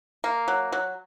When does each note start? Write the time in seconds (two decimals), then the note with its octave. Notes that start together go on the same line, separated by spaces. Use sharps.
0.24 A#3
0.48 F#3
0.72 F#3